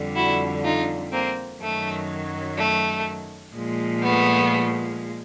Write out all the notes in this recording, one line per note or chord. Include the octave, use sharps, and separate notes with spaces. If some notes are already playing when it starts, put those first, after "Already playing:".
Already playing: F2 D3 G3
E4 F#4
D#4 F4
A#3 C4
F#2 D#3 F#3 A3
A3
A#2 F3 G#3
A3 B3